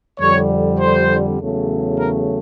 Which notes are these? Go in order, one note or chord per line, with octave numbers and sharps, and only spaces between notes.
F2 D3 G3 C#5
C5
E2 C#3 F#3 A3
A#4